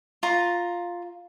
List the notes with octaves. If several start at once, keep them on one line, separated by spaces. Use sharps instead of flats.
F4 A#5